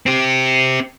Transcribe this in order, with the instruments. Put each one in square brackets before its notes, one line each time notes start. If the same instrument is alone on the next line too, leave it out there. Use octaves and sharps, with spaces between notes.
[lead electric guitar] C4 G4